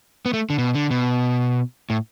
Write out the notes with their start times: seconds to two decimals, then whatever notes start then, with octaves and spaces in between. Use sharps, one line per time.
0.26 B3
0.34 A3
0.50 D3
0.58 B2
0.74 D3
0.91 B2
1.90 A2